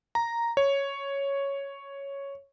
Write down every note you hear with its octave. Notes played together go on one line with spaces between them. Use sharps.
A#5
C#5